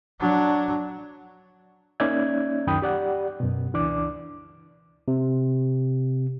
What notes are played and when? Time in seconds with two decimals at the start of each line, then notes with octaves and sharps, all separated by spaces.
0.19 F#3 D4
2.00 A#3 C#4 D#4 D5 E5 G#6
2.67 C#2 F#2 D#3 G5 B5 D#6
2.82 G4 D5 F#5
3.40 F#2 B2
3.74 C#2 E3 D4 D5 D6
5.08 C3